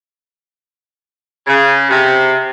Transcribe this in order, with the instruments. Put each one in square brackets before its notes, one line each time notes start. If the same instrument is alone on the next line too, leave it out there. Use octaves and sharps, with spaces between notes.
[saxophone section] C#3
C3